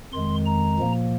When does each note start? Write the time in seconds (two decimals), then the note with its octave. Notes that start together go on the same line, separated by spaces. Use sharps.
0.13 F2 D#3 G#3 C6
0.46 A#5
0.79 A#2 F3 A#3